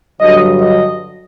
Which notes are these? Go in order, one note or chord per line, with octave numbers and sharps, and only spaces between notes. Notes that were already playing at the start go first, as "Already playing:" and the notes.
G2 D3 F#3 D#5
D#5